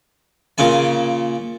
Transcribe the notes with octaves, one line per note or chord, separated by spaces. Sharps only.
A#2 C#3 G#5